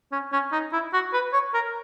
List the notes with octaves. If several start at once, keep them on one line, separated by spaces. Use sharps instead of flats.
C#4
C#4
D#4
E4
F#4
B4
C#5
A#4